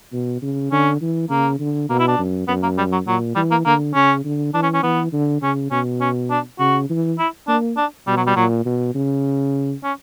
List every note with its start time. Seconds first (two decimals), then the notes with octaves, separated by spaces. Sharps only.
0.12 B2
0.42 C#3
0.72 D3 C#4
1.01 E3
1.30 C#3 A#3
1.59 D3
1.90 B2 A#3
1.99 E4
2.08 D4
2.18 F#2
2.48 F#2 B3
2.63 A#3
2.78 G3
2.92 F#3
3.07 A#2 F#3
3.36 E3 G3
3.51 A#3
3.65 D3 A#3
3.94 C#3 C#4
4.24 D3
4.54 E3 D4
4.63 C#4
4.74 C#4
4.83 E3 B3
5.12 D3
5.42 C#3 C#4
5.71 B2 C#4
6.00 C#4
6.30 D4
6.59 C#3 F#4
6.89 E3
7.19 E4
7.48 A#3 D4
7.77 D4
8.07 B2 G3
8.17 F#3
8.27 G3
8.36 A#2 F#3
8.65 B2
8.94 C#3
9.84 C#4